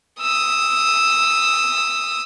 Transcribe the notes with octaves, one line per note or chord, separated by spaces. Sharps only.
D#6 E6